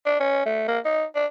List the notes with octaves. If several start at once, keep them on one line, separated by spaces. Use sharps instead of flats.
D4
C#4
A3
A#3
D#4
D4